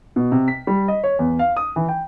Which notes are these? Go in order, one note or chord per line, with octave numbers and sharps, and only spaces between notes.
B2
C3
B6
G3
D#5
C#5
E2
F5
D#6
E3
G5